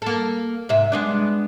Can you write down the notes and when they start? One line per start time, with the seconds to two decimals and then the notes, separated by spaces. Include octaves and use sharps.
0.02 A#3 A4
0.69 G#2 C3 E5
0.92 G#3 B3 D4